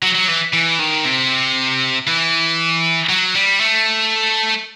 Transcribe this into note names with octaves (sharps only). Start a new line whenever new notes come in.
F#3
F#3
E3
E3
D#3
C3
E3
F#3
G3
A3